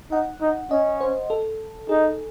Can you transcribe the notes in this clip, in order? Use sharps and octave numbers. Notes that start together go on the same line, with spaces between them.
D#4 F#5
D#4
C#4 D#5
C5
A4
D#4 G#4